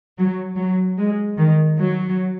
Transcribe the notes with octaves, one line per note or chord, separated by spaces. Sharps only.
F#3
F#3
G#3
D#3
F#3